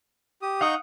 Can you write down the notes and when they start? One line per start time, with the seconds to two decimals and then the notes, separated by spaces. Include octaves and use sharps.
0.42 G4 D#6
0.61 D#4 F5 F#5 C#6 D#6 G6